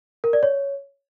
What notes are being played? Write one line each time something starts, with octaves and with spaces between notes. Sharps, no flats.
A#4
D5
C#5